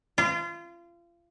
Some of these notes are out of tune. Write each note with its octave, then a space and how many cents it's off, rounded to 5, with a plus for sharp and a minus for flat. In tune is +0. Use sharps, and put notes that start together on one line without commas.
F4 -30